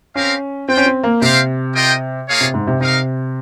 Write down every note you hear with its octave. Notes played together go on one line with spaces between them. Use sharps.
C4 C#4 G4 A#4 F5
C4 F4 C5 G5
C#4
C4
A#3
C3 C4 G4 C5 F5
F4 A#4 D#5 G5
A#3 F4 G#4 C#5 F5
C3
G#2
C3
C3 D#4 A#4 F5